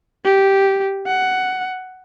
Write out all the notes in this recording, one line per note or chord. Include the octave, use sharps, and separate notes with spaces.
G4
F#5